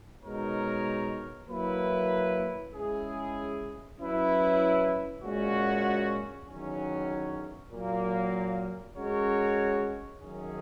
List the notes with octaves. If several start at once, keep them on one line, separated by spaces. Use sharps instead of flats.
B2 G#3 D#4 A#4 C#5
F#3 A#3 E4 B4
G#3 C#4 E4 G#4
F#3 C#4 E4 B4
A#2 G#3 C#4 F#4
E2 D#3 F#3 C#4
A#2 F#3 A#3
G#3 C#4 F#4 A#4 C#5
F#2 D#3 F#3 C#4 G#4